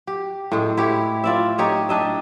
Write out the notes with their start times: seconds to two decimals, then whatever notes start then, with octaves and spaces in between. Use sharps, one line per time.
0.07 G4
0.52 A2 G#3
0.77 E4 G4 C#5
1.24 F4 D5 E5
1.58 D#4 G4 C#5 D#5
1.89 D4 D#5 E5